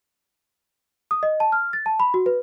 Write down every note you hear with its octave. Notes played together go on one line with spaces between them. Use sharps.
D#6
D#5
A5
F6
A6
A5
B5
F#4
B4